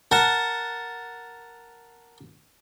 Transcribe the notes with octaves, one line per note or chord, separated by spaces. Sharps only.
A#4 F#5 A5